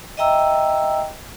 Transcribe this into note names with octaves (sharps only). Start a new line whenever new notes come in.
D#5 E5 G5 A#5 E6